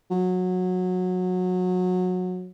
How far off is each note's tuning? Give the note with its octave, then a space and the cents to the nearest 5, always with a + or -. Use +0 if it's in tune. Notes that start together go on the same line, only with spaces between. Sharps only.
F#3 -20